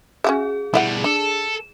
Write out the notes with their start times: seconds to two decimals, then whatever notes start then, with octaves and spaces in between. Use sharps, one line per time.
0.24 C#4 F#4 G#4 E5
0.74 B2 G3 E4 E5 F#5
1.04 D4 A4